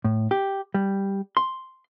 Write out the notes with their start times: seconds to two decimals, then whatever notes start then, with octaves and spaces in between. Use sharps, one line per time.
0.04 A2
0.31 G4
0.74 G3
1.37 C6